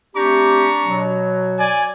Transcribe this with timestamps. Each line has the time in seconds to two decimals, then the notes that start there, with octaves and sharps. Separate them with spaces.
0.15 A3 C4 D4 G4 A#5 C#6
0.84 B2 F#3
1.58 D5 G#5